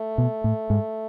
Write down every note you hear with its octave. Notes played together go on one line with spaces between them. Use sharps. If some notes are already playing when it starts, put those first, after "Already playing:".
Already playing: A3
B2
A2
G#2